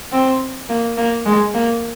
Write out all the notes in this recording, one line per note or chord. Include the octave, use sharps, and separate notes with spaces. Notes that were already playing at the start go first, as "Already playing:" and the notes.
C4
A#3
A#3
G#3
A#3